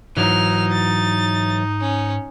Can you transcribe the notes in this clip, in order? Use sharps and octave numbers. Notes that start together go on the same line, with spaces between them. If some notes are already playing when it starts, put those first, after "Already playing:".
G#2 E3 F#3 D#4 F6
A6
C#4